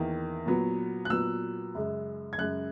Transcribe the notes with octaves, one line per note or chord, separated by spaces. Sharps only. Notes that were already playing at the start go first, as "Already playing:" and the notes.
Already playing: E2 D#3 A#3
A#2 F#3 B3
F#6
A#2 F#3 B3 E6
F#2 C#3 G#3
G#6
F#2 C#3 G#3 F#6